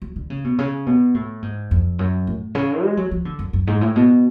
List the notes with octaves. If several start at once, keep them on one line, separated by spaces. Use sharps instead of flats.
F#3
D3
C#3
B2
C#3
B2
A2
G#2
F2
F#2
A2
C#3
G#3
F#3
F3
D3
F#2
F#2
G#2
A2
B2